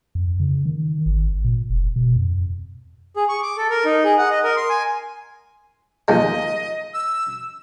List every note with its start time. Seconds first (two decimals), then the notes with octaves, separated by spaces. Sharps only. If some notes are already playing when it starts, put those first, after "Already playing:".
0.15 F2
0.40 C#3
0.65 D#3
1.06 G#1
1.44 A#2
1.69 F1
1.96 B2
2.16 F2
3.16 G#4
3.29 C#6
3.42 D6
3.57 A4
3.70 A#4
3.85 D#4
4.05 G#4
4.18 F#5
4.31 D#5
4.44 A#4
4.57 C6
4.70 G#5
6.08 D#2 F3 G#3 D#5
6.94 E6